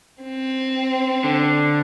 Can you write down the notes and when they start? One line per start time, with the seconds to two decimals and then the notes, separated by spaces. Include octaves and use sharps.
0.23 C4
1.24 D3